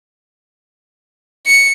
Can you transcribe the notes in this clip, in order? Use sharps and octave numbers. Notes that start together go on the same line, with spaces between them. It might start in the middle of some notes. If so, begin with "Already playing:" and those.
C#7